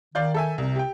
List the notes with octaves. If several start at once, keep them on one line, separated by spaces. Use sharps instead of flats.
D#3 D5 F5 G6
A4 E5 G#5
C2 C3
G4 G5